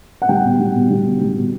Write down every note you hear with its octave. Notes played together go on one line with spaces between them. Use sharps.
F#5
G3 G5
B2
G3
B2
G3
B2
G3
B2